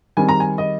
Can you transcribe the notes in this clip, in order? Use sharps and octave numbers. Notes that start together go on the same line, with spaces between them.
D#3 G3 C4 G#5
A#5
G#5
D#5